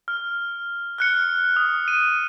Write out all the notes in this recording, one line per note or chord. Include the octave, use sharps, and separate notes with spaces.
F6
F6 F#6 C#7
D#6
D#7